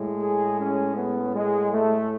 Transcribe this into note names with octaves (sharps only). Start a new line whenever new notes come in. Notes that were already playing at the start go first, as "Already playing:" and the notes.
Already playing: A2 G#3
G#4
C#4
B3
G#3
A3